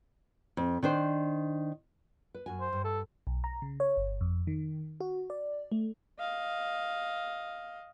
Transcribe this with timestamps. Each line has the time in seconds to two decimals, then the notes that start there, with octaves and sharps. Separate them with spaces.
0.57 F2
0.83 D#3 D4 C5
2.34 B4
2.46 F#2 F#4 G#5
2.60 C5
2.73 G2
2.84 A4
3.27 B1
3.44 A#5
3.62 C#3
3.80 C#5
3.97 G1
4.21 F2
4.47 D#3
5.01 F#4
5.30 D5
5.72 A3
6.19 D#5 F5